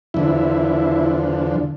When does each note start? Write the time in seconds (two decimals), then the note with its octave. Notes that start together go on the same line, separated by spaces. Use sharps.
0.14 E2 D3 F3 E4